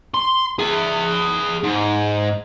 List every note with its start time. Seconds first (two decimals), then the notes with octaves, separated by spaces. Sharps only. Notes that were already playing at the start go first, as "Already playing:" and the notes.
0.14 C6
0.59 G#4 E5
1.64 G#2